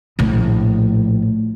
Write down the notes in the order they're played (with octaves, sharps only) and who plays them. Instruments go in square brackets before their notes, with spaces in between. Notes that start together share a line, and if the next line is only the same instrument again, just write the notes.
[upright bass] A#1 A2